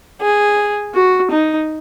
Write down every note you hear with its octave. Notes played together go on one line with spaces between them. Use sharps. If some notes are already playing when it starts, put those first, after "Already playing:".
G#4
F#4
D#4